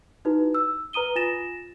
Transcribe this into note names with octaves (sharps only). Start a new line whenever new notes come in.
D#4 E4 F#4 B4
E6
B4 A#5 D#6 D#7 G7
F4 G#5 A6 A#6 E7